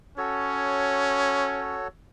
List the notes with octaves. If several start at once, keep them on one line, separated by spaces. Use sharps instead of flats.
C#4 F#4 A4 C#5